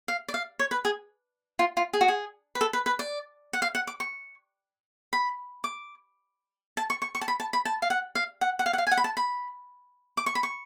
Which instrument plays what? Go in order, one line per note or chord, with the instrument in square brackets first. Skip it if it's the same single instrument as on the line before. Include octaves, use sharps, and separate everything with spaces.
[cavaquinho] F5
D5
F5
C#5
B4
G#4
F4
F4
G#4
F#4
G#4
B4
A4
B4
B4
D5
F#5
F5
F#5
D6
C#6
B5
D6
A5
C#6
C#6
C#6
A5
B5
A5
B5
A5
F5
F#5
F5
F#5
F#5
F5
F#5
F5
G#5
F#5
B5
A5
B5
D6
C#6
B5
C#6